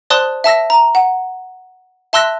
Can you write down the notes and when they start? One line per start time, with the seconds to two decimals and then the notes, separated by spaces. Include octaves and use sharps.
0.10 C5 D5 A5 C6 D#6 F#6
0.44 E5 A5 E6 A#6
0.70 A#5
0.95 F#5
2.13 E5 A5 C6 E6 F#6 A#6